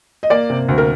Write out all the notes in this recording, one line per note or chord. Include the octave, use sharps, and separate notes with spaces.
D#5
A#3 D5
C3
D2
A#4